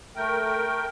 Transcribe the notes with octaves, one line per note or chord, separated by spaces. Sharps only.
A3 A#4 G5